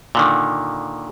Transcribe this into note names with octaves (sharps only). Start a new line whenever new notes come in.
A#2 D3 D#3